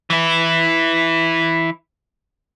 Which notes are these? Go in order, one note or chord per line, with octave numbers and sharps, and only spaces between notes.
E3 E4